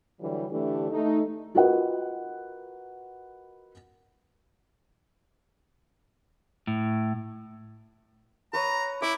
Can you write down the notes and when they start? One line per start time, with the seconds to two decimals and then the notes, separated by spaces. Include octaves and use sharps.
0.21 D3 E3 F#3 G3
0.50 D3 E3 A3 D4 E4 G4
0.90 A3 D#4
1.55 F4 F#4 A#4 B4 D#5 F#5
6.67 A2
8.53 B4 C#5 A#5 D#6
9.02 E4 D6